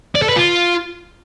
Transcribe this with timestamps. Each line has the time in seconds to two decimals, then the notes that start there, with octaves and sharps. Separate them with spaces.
0.15 D5
0.22 A4
0.29 B4
0.36 F4